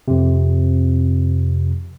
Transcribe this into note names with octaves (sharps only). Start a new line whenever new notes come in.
F2 C3